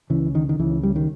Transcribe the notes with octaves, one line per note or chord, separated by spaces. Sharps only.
C#2 C#3 E3
D#3
D#3
C#2 C#3 E3
G3
D#3